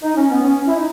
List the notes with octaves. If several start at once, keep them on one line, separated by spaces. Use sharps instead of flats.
D#4
C#4
B3
C#4
E4
D#4